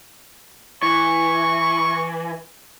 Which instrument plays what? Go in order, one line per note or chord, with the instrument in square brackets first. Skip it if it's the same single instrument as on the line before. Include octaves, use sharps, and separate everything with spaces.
[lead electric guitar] E3 [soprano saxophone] C#6